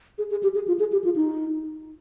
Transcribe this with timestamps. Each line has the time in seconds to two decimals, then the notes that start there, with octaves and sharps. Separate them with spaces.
0.18 G#4
0.31 G#4
0.43 G4
0.55 G#4
0.68 F4
0.79 G#4
0.92 G4
1.04 F4
1.16 D#4